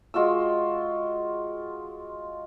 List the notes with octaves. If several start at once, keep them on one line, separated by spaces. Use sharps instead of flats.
G#3 F4 F#4 E6